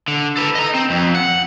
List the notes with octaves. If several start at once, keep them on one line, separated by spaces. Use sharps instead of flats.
D3
A4 B4
D#5 A#5
C4
F2
F#5